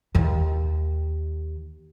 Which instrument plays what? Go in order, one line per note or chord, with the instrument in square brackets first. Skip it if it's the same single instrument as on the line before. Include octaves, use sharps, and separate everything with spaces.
[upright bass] D#2 D#3